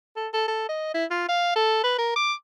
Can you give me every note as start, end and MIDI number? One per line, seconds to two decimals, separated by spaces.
0.16 0.28 69
0.34 0.48 69
0.48 0.64 69
0.69 0.93 75
0.94 1.05 64
1.11 1.27 65
1.29 1.55 77
1.56 1.82 69
1.84 1.96 71
1.98 2.15 70
2.16 2.33 86